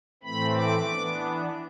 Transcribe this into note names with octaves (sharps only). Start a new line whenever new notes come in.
A2 E3 A3 C4 B5
D6
E3 B3 D4